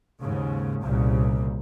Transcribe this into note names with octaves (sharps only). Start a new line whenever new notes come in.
D#2 G#2 C#3
C2 A#2 C#3